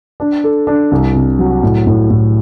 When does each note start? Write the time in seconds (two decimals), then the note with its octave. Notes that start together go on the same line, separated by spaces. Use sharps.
0.20 D4
0.44 A4
0.67 D4
0.91 C2
1.15 C3
1.39 F#3
1.63 A2
1.87 A2
2.10 A2